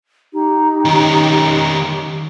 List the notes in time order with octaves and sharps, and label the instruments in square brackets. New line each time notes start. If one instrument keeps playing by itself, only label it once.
[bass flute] D#4 [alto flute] G4
[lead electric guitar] D#3 C#4